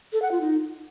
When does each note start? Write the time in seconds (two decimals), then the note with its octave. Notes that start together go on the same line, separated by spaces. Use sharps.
0.13 A4
0.22 F#5
0.32 F4
0.41 D#4